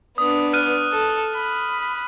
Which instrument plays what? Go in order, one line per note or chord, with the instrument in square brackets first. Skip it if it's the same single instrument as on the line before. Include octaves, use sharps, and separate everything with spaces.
[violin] B3 D4 [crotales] D#6
[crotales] F6 F#6 D#7
[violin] A4
B5